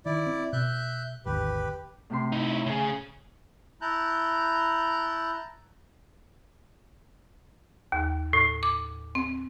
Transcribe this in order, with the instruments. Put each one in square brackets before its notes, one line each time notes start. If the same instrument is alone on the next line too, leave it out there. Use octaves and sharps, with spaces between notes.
[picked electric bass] D#3 [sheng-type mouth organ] E4 D5
[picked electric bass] C4
[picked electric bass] B2 [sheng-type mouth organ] E5 F#6 G6
[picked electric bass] G#1 D#2 D3 [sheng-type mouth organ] G4 B4
[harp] A2 C3 C6
[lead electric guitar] D#4 E4
[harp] C#5
[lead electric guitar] C#3 G#4
[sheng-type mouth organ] E4 A5 A#5 F#6 G6
[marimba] D#2
A2
D6
C4